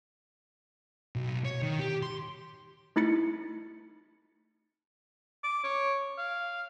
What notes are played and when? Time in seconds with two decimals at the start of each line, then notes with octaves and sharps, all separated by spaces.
1.15 B1
1.45 C#5
1.62 D#3
1.79 G4
2.03 C6
2.96 A3 D#4 E4 B5 A6 C#7
5.44 D6
5.64 C#5
6.18 F5